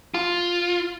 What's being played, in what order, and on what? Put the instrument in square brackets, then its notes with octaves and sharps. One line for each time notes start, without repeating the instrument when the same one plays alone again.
[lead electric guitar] F4